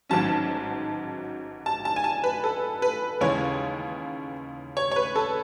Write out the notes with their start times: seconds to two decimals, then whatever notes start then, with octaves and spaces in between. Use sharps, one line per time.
0.10 A1 G#2 D#3 F#3 C#4 A5
1.66 A5
1.85 A5
1.96 G#5
2.04 A5
2.24 B4
2.44 A4
2.82 B4
3.21 D#2 C#3 E3 G#3 C#5
4.77 C#5
4.92 C#5
4.96 B4
5.16 A4